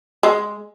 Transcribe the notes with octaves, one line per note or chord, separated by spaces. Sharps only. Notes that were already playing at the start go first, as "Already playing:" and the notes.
G#3